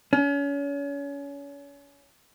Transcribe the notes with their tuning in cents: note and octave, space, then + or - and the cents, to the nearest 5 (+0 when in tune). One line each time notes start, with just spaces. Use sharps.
C#4 +35